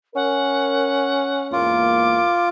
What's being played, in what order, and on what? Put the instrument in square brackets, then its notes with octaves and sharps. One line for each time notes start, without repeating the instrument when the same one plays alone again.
[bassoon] C#4 [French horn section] A#4 [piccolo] F#5
[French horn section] E2 G#2 A#3 [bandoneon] F4 [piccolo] D6